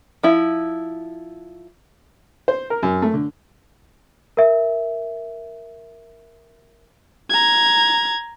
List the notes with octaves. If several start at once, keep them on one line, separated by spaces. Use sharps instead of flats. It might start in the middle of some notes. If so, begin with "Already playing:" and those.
F3 E4
C5
A#4
F#2
A3
D3
A#4 E5
A#5 G#6